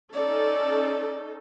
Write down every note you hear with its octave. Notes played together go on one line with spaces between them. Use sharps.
C#4 D#4 A4 D5